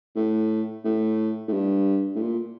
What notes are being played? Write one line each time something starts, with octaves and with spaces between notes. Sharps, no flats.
A2
A2
A2
G2
A2
A#2